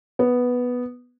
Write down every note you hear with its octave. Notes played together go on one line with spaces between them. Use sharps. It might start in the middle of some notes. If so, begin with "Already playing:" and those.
B3